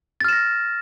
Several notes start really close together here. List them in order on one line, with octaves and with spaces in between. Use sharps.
A6 F6 E7 A#6